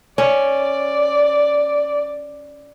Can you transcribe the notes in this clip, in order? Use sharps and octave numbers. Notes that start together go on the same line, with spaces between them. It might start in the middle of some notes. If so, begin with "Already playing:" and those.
C#4 D5